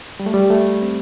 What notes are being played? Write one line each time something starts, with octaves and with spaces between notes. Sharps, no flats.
G3
A3
G3
A3
C4